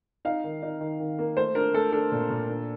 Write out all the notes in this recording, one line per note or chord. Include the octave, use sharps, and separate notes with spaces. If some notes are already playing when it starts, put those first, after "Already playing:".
D#4 F5
D#3
D#4
D#3
D#3
A#3
A3 C5
D4 A#4
A3 A4
D4 A4
A#2
A#2
D4